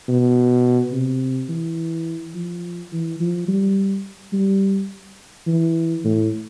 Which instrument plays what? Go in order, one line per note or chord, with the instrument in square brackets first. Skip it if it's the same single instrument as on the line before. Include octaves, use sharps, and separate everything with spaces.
[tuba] B2
C3
E3
F3
E3
F3
G3
G3
E3
A2